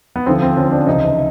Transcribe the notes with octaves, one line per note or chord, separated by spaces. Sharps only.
B3
D2 D3 F3 C4
C4
D2 D3 F3 C#4
D4
C#2 C3 E3 D#4